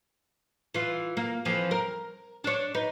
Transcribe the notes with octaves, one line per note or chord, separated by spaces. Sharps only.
E3 F4
A#3
F2 E3 F3
A#4
D4 C#5
D#4 B4